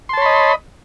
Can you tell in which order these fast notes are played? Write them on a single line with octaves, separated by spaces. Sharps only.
C6 A5 C#5 B5 D#5